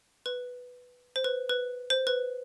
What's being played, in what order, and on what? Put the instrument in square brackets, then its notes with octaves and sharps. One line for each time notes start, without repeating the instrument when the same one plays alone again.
[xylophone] B4
C5
B4
B4
C5
B4